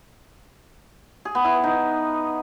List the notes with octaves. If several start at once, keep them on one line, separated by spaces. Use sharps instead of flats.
G#4
B3
E4
B4
D#4